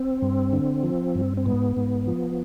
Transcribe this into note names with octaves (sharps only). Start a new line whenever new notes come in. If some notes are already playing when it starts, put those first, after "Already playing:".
Already playing: C4
G2
D3
F3
G2
C4
G#2 B3
G#2
F3